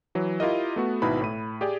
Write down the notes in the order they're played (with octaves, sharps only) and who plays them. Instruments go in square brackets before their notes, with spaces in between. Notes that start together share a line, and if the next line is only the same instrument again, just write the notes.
[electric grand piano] E3 F#3
E4 F4 G4 A#4 D#5
A3 B3 F#4
G#1 B2 D#4 E4 B4 B5
A2 B5 D#7
G4 G#4 D5 G5